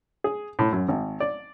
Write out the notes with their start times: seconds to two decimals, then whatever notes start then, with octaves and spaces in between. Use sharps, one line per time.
0.24 G#4
0.59 A2
0.72 F#2
0.89 G#1
1.20 D5